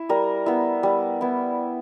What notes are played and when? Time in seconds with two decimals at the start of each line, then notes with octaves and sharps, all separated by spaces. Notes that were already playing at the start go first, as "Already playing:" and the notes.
Already playing: E4
0.09 G3 A#4
0.46 B3 E4
0.83 G3
1.21 B3 E4